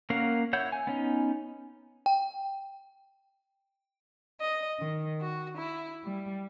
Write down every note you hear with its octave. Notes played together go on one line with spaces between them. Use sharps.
A#3 C#4 A#4 F5 F#5
E4 C#5 F#5 G6
G#5
B3 C#4 D#4
G5
D#5
D#3
F#4
E4
G3